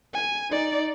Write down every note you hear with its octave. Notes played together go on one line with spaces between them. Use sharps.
G#5
D#4 D5